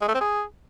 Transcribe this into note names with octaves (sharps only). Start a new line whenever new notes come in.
G#3
A3
C4
G#4